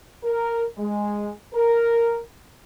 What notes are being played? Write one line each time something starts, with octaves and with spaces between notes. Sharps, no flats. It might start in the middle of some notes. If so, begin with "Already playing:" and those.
A#4
G#3
A#4